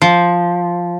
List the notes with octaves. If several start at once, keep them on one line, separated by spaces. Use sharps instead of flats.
F3